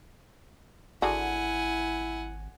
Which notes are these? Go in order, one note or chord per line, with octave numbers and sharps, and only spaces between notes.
G#1 D3 E4 F#4 G#4 F#5 G#5